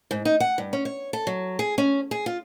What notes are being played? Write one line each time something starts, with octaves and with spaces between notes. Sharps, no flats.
G#2
D#4
F#5
G2
C#4
C#5
A4
F#3
G#4
C#4
G#4
F4